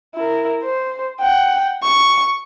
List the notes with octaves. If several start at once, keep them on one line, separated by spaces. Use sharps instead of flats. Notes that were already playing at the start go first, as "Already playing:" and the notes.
E4 A#4
C5
F#5 G5
C#6